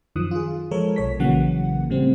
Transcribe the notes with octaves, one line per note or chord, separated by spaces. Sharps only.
F#2 D#3 F3 D#6 F#6
F4 G#4
F3 G#3 A4 A#4 C#5
B1 C#5 B6
A#1 C#3 E3 F#3 A#3 F#5
A2 C#3 G3 A3 C4